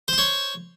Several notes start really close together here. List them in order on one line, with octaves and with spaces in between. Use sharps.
C5 C6 C#5